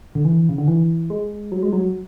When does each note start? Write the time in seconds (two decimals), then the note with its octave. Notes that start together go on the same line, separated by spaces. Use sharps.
0.15 D3
0.25 E3
0.49 C#3
0.58 D3
0.68 E3
1.10 G#3
1.52 F#3
1.63 G#3
1.73 F#3